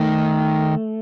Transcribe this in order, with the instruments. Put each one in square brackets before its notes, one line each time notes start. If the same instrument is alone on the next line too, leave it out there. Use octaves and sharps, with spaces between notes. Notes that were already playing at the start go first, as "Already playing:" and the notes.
Already playing: [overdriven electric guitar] D#3 [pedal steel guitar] A3